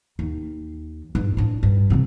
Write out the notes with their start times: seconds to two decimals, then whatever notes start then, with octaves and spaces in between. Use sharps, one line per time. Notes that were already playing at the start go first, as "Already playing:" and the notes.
0.19 D#2
1.15 G2
1.37 A2 D4
1.63 G2
1.90 D#1 C3